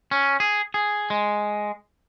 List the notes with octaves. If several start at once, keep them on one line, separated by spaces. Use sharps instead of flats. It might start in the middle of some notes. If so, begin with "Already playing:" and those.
C#4
G#4
G#4
G#3